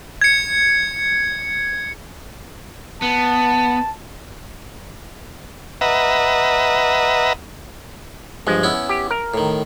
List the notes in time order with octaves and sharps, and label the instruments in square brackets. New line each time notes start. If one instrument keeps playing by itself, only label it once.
[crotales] G#6 C#7
[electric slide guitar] B3 [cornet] A5
[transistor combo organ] B4 D#5 E5 F#5 A#5
[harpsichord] G2 F3 [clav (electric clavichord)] G#3
[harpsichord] B3 C#4 E4
[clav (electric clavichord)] G4
A#4
[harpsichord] A2 D#3